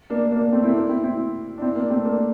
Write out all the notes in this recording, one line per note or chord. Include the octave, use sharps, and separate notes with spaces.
A#3 D4
A#3 D4
A#3 D4
A3 C4
C4 E4
A#3 D4
C4 E4
C4 E4
D4
C4 E4
A#3 D4
A3 C4
A#3 D4